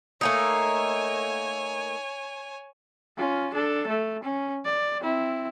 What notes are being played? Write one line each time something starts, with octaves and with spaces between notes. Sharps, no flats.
A3 A#3 D#4 C#5 G#5
C#4 F4
D4 A4
A3
C#4
D5
C4 E4